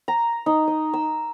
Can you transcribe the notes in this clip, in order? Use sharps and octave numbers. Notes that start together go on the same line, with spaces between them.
A#5
D#4
D#5
E6